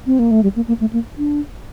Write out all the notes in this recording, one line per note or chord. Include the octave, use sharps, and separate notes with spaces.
C4
A#3
A3
G3
A#3
A#3
A3
A#3
D4